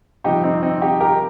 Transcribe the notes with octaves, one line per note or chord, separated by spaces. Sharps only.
G1 F2 C3 F3 D#4 G4
C4 D#4
C4 D#4
D#4 G4
G4 A#4